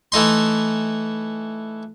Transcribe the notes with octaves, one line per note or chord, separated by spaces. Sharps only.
E3 A3 D#4 C6